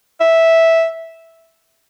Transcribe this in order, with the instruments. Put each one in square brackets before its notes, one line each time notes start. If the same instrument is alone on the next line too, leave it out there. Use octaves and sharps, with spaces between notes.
[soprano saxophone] E5